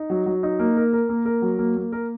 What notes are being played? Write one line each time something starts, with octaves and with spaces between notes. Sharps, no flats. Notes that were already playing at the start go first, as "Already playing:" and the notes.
Already playing: D#4
F#3
F#3
D#4
A#3
A#4
A#4
A#3
A#4
F#3
A#3
A#3
A#4